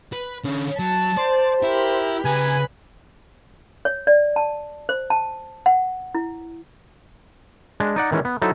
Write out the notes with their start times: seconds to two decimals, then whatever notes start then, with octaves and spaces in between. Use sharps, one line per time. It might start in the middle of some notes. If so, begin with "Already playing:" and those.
0.13 B4
0.44 D3 C#4
0.79 F#3 A5
1.17 C5 D5
1.63 E4 G4 A#4
2.25 C#3 B4 G#5 A#5
3.85 C#5
4.07 D5
4.36 A5
4.89 C5
5.10 A5
5.66 F#5
6.15 E4
7.80 G#3 D4
7.96 D#4 D5 F#5
8.12 D#3 E3 G#3 C#4
8.25 B3
8.42 F#3 D#4 E4 A4 C5